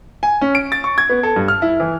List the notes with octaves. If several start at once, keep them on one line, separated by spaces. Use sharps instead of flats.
G#5
C#4
D7
A6
C#6
G#6
B3
A4
G2
F6
E4
E3